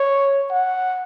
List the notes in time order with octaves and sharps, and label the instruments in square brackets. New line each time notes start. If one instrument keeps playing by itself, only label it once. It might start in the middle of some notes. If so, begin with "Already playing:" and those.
Already playing: [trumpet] C#5
F#5